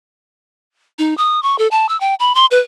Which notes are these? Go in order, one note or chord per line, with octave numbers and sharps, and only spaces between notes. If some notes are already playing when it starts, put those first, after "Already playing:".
D#4
D#6
C#6
A4
A5
E6
G5
B5
C6
B4